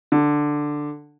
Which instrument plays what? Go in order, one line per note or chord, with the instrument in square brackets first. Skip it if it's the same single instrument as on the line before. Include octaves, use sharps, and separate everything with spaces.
[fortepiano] D3